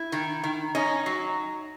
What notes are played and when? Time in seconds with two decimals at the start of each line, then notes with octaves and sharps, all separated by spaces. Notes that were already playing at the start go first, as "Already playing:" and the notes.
Already playing: E4
0.12 D#3
0.43 D#3
0.75 C#4 D#4
1.06 F#3